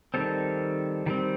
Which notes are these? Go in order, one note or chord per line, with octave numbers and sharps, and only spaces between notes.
D#3 G3 C4 A4
D#3 G3 C4